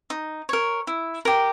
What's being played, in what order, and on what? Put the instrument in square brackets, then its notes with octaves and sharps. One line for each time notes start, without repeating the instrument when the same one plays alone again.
[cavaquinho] D#4
A#4 C#5
E4
G4 A#4